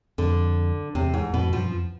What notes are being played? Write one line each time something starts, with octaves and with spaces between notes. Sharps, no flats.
F2 D3
E2 C3
G#2
F2 B2
G2 F3
F#2
F2